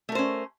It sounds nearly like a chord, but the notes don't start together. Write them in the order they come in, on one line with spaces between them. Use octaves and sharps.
A3 A#4 C5 C#4